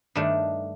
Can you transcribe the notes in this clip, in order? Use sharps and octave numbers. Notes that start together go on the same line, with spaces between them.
G2 D#3 A3 D4